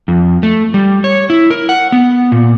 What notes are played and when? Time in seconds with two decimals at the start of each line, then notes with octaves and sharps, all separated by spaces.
0.08 F2
0.43 A3
0.74 G3
1.04 C#5
1.30 E4
1.50 A#4
1.69 F#5
1.92 B3
2.32 A#2